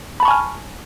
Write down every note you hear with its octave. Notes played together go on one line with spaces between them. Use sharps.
G#5 A5 B5 C#6 F6